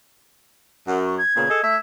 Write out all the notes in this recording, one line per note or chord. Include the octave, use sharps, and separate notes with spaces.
F#2 F#5
C#6
G#6
A#2 C#3 B3
G#4 A4 D#5
A3 E5